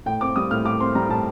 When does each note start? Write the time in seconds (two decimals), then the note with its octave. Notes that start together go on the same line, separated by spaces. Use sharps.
0.06 A2 G5
0.21 C4 D6
0.36 G3 D#6
0.51 A2 F6
0.65 A2 D6
0.80 C4 C6
0.95 G3 A#5
1.09 A2 A5